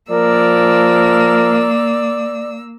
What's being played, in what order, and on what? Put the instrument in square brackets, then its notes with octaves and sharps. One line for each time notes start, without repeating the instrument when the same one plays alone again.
[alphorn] F3 [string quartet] A#3 E6 [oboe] A#4 [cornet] D5